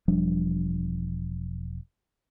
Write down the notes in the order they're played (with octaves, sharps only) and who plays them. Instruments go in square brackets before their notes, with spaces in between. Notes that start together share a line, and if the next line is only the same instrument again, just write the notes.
[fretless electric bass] E1 F3 G3 D4